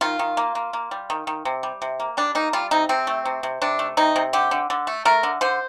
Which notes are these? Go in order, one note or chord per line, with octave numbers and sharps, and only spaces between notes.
D#3 F4
D#3
A#3
A#3
A#3
G3
D#3
D#3
C3
G3
C3
A#3
G3 D4
A#3 D#4
G3 F4
C3 D#4
C3 C4
A3
C3
C3
C3 D4
A3
C3 D#4
C3
D3 G4
D3
D3
A3
A3 A#4
D3
D3 C5